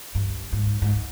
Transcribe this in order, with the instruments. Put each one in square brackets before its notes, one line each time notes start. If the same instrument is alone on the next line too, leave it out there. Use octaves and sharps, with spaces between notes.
[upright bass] G2
G#2
G#2